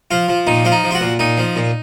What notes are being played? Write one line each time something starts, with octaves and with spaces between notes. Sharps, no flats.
F3 F4
F3
A#2 D#4
F3 F4
D#4
F3
F4
F#4
A#2
A#2 D#4
F3
A#2